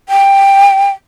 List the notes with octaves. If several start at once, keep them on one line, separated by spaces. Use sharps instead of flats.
G5